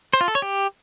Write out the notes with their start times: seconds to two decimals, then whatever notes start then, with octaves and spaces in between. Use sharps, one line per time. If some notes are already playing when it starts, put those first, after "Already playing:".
0.13 C5
0.21 F4
0.28 A4
0.35 C#5
0.42 G4